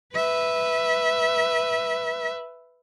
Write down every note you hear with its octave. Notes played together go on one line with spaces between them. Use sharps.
B4 E5